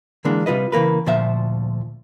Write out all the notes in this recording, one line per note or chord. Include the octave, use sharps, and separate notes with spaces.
D3 E3 G#3 A#3 D4
C3 G3 F4 B4 D#5
C#3 E3 A#3 A#4 B4
D2 A#2 F3 C5 E5 F5